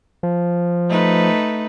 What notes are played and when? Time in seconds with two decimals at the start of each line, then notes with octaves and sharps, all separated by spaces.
0.23 F3
0.89 A3 D#4 B4